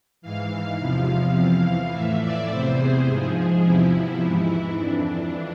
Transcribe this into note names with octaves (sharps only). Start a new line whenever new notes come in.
G#2 E3 F5
E2 C3 F3
F2 E3
A2 E3 E5
D5
E2 C3 E3 C5
G#4
G#2 F3
E2 C3 F3 E4
G#2 E3
F2 E3 D4